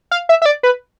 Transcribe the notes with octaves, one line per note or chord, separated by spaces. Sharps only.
F5
E5
E5
D5
B4